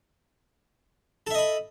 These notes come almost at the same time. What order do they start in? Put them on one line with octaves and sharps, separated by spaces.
A4 E5 D#5 B5